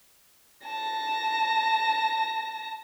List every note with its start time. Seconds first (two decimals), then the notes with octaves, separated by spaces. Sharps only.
0.65 A5 A#6